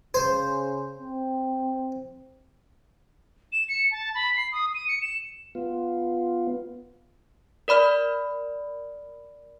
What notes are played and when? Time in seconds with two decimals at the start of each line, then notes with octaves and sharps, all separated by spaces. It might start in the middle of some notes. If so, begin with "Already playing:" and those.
0.14 C#3 C5
0.99 C4
3.52 E7
3.69 C#7
3.91 A5
4.15 B5
4.37 C7
4.52 D#6
4.75 D#7
4.88 C#7
5.02 E7
5.55 B3 F4
7.68 A#4 D5 B5 F6